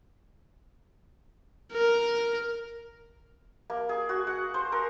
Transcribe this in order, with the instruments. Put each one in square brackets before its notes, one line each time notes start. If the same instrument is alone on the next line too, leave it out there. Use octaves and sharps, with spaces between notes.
[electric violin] A#4
[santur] A#3
G#4
F#4
F#5
C5
A#4